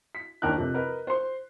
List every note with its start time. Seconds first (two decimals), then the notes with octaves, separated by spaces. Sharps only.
0.15 B6
0.42 D#2 D4 A#4 G5 A5 F#6
0.57 F2 C3
0.74 A#4 B4 D#5
1.07 C5 C6